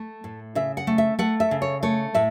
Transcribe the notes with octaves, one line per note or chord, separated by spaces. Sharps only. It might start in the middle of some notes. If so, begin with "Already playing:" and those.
Already playing: A3
A2
C#3 E5
F#5
A3
E5
A3 F#5
E5
C#3
C#5
A3 C#5
A2 E5